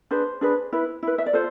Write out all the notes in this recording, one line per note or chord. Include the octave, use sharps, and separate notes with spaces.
D4 G#4 B4 C5
D4 G#4 B4
E4 B4
E4 B4
E5
D5
F4 A4 C5